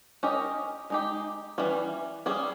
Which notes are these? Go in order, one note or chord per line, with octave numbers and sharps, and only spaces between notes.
C#4 G4 A#4 D#5
G#3 D#4 G4
E3 G3 C#4
G3 C#4 G#4